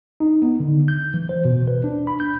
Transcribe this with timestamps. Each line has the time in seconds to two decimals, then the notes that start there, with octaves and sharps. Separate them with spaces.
0.20 D#4
0.42 B3
0.60 D3
0.88 G6
1.14 E3
1.29 C5
1.45 B2
1.68 B4
1.84 D4
2.07 B5
2.20 G6